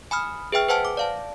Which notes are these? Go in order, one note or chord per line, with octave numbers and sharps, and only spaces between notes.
G#5 B5 D#6 F6
G#4 B4 E5 G5 F6
B4 C5 F#5 G#5 A5 F6
D6
D5 F5 A5